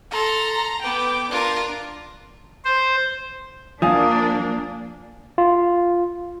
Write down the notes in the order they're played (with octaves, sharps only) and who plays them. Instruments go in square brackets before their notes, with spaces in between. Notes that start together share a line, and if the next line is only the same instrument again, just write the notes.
[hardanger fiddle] A4 C6 [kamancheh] A#5
[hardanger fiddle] B3 B4 [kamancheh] G5 D6
[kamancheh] D4 [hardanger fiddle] F4 A#4
[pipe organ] C5
[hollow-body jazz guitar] F3 [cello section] A#3 D4 [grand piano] F5 G#5 D#6
[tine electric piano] F4